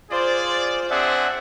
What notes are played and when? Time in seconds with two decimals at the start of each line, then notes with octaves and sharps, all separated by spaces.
0.11 F4 G#4 C5 D5
0.43 C5
0.91 C4 D4 G#4 D5 E5 F#5